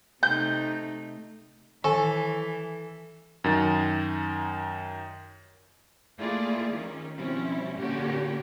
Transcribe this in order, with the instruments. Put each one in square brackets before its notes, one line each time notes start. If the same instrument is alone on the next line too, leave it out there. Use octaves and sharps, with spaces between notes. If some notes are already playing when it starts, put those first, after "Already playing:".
[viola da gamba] C3 A3 D#4 [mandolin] G6
[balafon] D#3 [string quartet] E3 [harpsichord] A4 [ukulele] G#5
[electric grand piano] F#2 D#3 A6
[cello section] A3 A#3 E4 F4 G#4 D5
D#3 C#4
B2 F3 G3 C4 C#4 E4
A#2 D3 A#3 C#4 F#4 G4